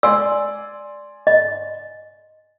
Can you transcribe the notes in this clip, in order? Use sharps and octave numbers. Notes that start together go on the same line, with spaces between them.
D5 G#5 C6 E6
D#5